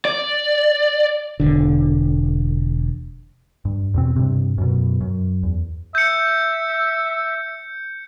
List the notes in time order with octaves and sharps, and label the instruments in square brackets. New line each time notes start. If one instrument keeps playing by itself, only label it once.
[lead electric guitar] D5
[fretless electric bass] E1 D3
[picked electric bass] G2
E2 B2 C4
G2 C3
F#2 B2
F#2
E2
[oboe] E5 [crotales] G6 C#7